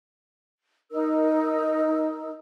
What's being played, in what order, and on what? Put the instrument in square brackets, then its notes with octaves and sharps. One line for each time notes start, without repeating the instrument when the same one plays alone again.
[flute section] D#4 A#4 E6